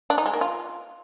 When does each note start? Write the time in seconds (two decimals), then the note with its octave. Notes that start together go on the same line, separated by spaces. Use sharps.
0.10 D4
0.18 D#4
0.26 G#3
0.33 A#3
0.41 F4